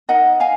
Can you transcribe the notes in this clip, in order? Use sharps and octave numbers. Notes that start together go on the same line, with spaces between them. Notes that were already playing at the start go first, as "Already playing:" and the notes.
D#4 A#4 D#5 F#5
F5 G#5